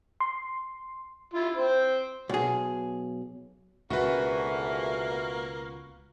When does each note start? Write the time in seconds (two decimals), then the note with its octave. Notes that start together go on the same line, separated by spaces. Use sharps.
0.20 C6
1.34 E4 F4
1.56 C4 C5
2.29 B1 G#4
3.90 C#2 G#2 B2 D3 E3 A#3 F#4 B4